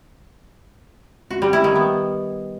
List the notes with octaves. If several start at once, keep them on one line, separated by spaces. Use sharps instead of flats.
F#4
G3
E4
D#3
B3